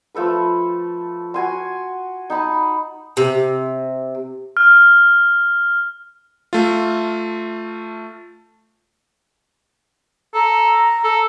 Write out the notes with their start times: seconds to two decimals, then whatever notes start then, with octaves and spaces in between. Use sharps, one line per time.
0.15 F3 A3 A4 B4
1.34 F#4 G#5 C6
2.30 D#4 A5 B5
3.17 C3
4.57 F6
6.53 A3 F4
10.34 A4 A#5
11.04 A4